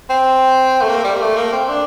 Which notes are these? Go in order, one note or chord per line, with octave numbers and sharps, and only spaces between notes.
C4
A3
A#3
G3
A#3
A3
A#3
C4
D4